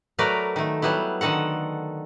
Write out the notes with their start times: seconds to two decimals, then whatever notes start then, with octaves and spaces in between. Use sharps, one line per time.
0.19 F#3 A3 A#4 B4 D5
0.56 D#3 A3
0.82 F#3 G3 B3 E4
1.21 D3 D#3 A4 F#5